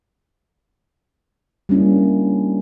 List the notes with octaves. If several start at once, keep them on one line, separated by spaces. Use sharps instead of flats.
G3 A#3 C#4 D4 E4